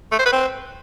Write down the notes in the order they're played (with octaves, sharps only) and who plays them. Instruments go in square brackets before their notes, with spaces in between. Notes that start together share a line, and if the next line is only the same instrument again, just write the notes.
[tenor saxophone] A3
C5
B4
C4